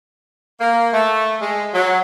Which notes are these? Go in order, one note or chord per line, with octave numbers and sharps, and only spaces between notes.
A#3
A3
G#3
F#3